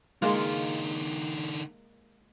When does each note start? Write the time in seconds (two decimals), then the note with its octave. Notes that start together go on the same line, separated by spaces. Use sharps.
0.22 D3 G#3 A#3 D#4 F4